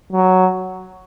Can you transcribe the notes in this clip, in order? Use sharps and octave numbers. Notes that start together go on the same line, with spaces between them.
F#3